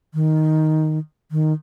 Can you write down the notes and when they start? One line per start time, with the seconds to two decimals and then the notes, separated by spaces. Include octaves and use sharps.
0.14 D#3
1.32 D#3